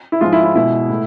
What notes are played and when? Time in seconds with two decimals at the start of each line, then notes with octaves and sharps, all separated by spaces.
0.12 E4
0.21 G#2 F3 G#3 F4
0.33 E4
0.44 E4
0.55 B2 G#3 E4
0.89 A2